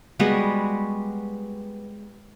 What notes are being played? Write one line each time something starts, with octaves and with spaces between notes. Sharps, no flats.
G3 G#3 B3 F#4